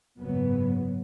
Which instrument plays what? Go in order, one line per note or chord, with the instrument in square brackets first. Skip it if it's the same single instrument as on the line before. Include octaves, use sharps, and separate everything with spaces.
[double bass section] F#1 G#2 F#3 B3